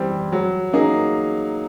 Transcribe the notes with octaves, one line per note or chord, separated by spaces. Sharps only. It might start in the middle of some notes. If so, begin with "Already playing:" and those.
Already playing: E3 G3 C4
F#3
A#3 D#4 G#4